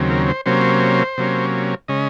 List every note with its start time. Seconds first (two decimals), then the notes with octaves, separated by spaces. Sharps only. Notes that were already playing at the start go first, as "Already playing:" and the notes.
Already playing: D#2 C#3 F#3 C4
0.10 A#4
0.29 C5
0.46 C3 F#3 A#3 C#4 C5
1.18 C3 F#3 A#3 C#4
1.88 C#3 G#3 C#4 D#5